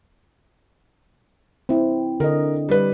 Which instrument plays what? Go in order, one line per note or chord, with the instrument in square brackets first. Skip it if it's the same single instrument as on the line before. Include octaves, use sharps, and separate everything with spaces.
[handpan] C4 E4
[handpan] D3 D#5 [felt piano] A#4
[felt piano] G3 B4